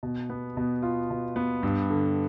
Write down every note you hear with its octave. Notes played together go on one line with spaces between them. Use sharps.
B2
B3
B2
F4
B2
B3
G2
D3